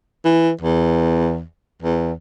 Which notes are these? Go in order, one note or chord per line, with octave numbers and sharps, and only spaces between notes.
E3
E2
E2